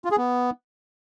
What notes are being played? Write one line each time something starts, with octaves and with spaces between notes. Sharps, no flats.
F4
G#4
B3